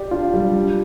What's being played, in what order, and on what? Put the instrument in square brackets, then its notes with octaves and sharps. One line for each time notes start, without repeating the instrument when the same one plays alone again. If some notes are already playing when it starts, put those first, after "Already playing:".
Already playing: [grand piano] G4 D5
[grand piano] D4 [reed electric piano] F4
[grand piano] G3
D4